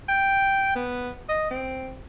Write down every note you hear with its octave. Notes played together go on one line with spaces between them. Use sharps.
G5
B3
D#5
C4